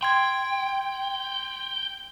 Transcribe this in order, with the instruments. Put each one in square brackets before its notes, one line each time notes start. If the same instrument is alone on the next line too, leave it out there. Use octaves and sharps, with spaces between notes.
[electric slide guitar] G5 [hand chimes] C6 G#6